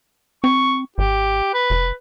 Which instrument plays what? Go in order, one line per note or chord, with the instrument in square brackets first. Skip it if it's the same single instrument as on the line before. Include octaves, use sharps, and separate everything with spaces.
[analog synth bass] C4 [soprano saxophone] C#6
[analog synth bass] G#1 [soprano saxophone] G4
[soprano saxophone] B4
[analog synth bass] F1